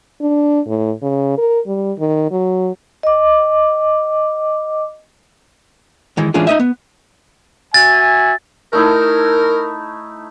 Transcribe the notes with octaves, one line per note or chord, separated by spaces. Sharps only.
D4
A2
C#3
A#4
G3
D#3
F#3
D#5 D6
D#3 E3 G#3
E3 G#3 C#4 D4 F4 G#4
D#4 D#5 E5
B3
F#4 E5 G#5 A6
A3 D#4 E4 A#4